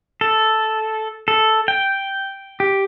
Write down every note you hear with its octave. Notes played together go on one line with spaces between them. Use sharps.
A4
A4
G5
G4